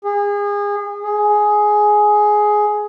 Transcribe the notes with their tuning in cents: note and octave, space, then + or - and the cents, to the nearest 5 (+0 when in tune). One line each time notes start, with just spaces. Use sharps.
G#4 -30
G#4 +10